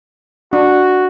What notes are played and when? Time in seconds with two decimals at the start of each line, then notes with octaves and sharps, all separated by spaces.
0.53 D4 F#4